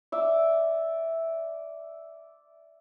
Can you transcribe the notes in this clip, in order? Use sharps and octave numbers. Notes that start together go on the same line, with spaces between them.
D5 E5